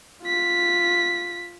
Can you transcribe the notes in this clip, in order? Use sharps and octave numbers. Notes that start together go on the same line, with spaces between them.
F4 B6